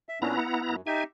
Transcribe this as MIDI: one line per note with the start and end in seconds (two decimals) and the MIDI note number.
0.09 0.19 76
0.22 0.36 46
0.22 0.76 59
0.22 0.36 61
0.22 0.36 62
0.22 0.76 64
0.22 0.76 82
0.37 0.61 78
0.68 0.81 42
0.87 1.03 63
0.87 1.03 67
0.87 1.03 76
0.87 1.04 80